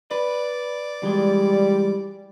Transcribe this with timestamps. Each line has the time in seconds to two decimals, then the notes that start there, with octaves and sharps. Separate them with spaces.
0.11 B4 D5
1.03 E3 G3 G#3